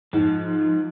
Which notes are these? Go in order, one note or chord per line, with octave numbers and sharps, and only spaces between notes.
G#2 F3